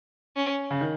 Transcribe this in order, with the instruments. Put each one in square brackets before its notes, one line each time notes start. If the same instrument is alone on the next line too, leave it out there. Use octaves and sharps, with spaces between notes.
[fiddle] C#4
[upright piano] C#3
D#3